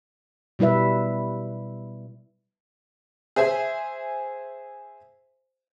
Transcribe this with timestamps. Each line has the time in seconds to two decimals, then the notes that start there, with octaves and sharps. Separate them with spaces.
0.59 B2 G3 E4 B4 E5
3.36 G#4 C5 E5 G#5